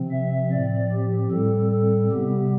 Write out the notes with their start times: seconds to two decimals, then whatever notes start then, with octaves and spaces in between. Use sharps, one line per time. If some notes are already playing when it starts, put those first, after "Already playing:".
Already playing: C3 F3 C4
0.11 E5
0.52 A2 F3 C4 D5
0.91 G4
1.31 A2 G3 C4 A4
1.71 A4
2.11 C3 G3 B3 G4